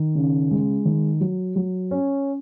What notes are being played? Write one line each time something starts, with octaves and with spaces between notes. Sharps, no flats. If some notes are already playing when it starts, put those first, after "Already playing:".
Already playing: D#3
C#3
G#3
D#3
F#3
F#3
C#4